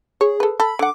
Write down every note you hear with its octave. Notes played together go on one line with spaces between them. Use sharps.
G#4 C#5
A4 B4
A4 B5
D3 F#5 D6